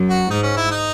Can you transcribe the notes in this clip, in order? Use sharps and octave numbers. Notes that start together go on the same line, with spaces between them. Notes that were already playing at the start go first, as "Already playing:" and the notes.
Already playing: F#2
F#4
G#2 D#4
C#4
E4
D#4